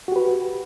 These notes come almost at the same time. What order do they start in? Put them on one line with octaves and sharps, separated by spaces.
F#4 G4 B4